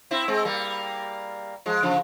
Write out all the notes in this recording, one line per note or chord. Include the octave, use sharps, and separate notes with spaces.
C4 E4
G#3 C4
G3 A#3
F3 G#3
C#3 F3